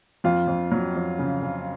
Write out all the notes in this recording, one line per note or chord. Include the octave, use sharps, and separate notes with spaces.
F2 F4
F2
F#3
F2
C#3
C#3